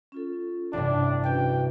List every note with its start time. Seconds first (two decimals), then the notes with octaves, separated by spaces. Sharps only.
0.12 C#4 F4 A4
0.73 A1 G2 C3 D4 G5 A5
1.25 C#4 F#4 B4 G5